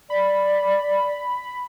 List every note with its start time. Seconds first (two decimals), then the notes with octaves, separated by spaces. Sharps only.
0.10 D5 B5